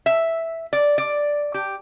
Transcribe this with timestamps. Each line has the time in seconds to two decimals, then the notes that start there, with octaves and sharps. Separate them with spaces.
0.06 E5
0.73 D5
0.98 D5
1.54 G4